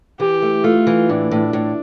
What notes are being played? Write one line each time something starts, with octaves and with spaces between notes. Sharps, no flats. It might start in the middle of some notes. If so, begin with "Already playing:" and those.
E3 G4
A3
A3 F4
E3
A2 D4
A2
A2